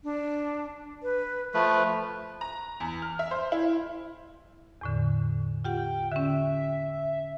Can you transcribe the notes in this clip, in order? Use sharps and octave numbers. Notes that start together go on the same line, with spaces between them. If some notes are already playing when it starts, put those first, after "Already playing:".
D4
B4
F3 A3 B4 C#6
A#5
E2
F6
E5
C5
E4
E2 A2 D3
F4 G4 F#5 G5
D3 C#4 E5